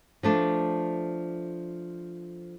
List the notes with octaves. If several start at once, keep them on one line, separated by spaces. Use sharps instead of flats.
F3 A3 D4